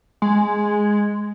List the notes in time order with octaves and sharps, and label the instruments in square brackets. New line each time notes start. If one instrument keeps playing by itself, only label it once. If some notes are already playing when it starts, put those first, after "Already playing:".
[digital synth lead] G#3